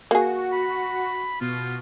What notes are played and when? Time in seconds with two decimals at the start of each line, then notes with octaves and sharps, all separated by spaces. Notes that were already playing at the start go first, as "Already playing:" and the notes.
0.11 A#3 F#4 G#4
0.52 B5
1.41 B2 F4